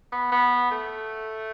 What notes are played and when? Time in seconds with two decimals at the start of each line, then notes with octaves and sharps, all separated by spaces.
0.12 B3
0.32 B3
0.71 A3